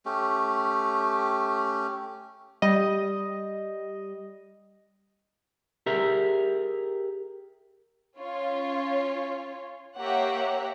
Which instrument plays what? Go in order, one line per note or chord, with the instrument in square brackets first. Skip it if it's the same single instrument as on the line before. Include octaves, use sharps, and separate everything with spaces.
[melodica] A3 C#4 G4
[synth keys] G3 D#5
[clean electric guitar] G4 G#4 A#4 E5
[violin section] C#4 F4 C#5
A#3 G4 C#5 E5 F#5 A#5